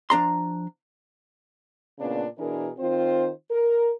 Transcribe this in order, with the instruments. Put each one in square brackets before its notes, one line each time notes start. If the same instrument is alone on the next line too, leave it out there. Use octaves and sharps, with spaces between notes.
[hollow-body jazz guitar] F3 D4 A#5 C6
[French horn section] A#2 C#3 B3 D4
B2 E3 D4 G#4 A#4
D#3 C4 F4 C5
A#4